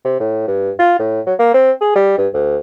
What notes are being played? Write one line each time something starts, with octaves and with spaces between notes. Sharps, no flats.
C3
A2
G2
F4
A2
F#3
A#3
C4
G#4
G3
G2
D2